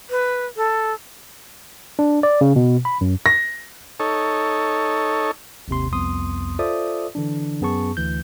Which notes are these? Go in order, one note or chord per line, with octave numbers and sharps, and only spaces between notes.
B4
A4
D4
D5
C#3
B2
B5
F#2
A#6
D#4 A4 C#5
G#1 D#2 C3 C6
C2 F2 B3 C6 D#6
F4 A4 C5 D5 E5 D#6
D3 E3 D4
F#2 B3 G#4 A5 C#6
D2 E3 G6